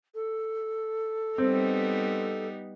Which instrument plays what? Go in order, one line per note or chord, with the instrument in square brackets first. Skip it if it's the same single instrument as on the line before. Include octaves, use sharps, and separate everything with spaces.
[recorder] A4
[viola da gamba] G3 B3 D#4 [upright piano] C4